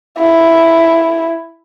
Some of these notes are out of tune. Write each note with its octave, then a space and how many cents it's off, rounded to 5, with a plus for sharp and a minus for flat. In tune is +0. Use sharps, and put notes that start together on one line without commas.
E4 +0